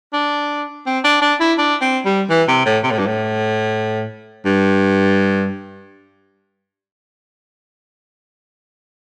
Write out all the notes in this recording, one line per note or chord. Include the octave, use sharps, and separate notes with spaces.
D4
C4
D4
D4
E4
D4
C4
G3
E3
C3
A2
C3
A2
G2
A2
G2